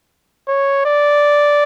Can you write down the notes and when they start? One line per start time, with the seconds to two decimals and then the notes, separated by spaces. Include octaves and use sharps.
0.48 C#5
0.85 D5